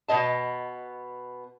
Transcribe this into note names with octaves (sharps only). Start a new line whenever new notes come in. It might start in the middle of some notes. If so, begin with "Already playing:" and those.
B2 B3 D#5 A5